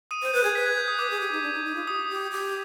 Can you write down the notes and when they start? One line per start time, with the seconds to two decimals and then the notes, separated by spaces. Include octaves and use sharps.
0.11 D#6 D#7
0.23 C5
0.33 B4 G6
0.44 G#4 G#6
0.55 B4 B6
0.66 G#6
0.78 G6
0.88 D#6
0.98 B4 D6
1.10 G#4
1.21 G4
1.32 D#4
1.42 D4
1.53 D#4
1.65 D#4
1.75 F4
1.87 G4 D#6
2.09 G4
2.31 G4